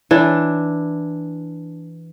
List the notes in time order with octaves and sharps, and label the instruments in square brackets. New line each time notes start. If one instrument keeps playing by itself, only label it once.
[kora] E3 D4